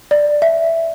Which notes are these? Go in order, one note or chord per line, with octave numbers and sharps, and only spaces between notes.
D5
E5